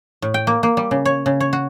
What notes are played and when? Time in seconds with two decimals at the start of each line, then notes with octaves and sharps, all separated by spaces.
0.22 A2
0.34 G5
0.47 A#3
0.63 A#3
0.77 G3
0.91 C#3
1.05 C#5
1.26 C#3
1.40 C#5
1.53 F#4